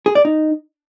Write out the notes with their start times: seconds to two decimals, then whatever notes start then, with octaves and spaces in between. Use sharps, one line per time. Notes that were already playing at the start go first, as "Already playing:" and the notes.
0.06 G#4
0.15 D5
0.25 D#4